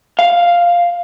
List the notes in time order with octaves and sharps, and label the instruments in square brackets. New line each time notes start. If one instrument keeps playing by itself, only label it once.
[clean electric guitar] F5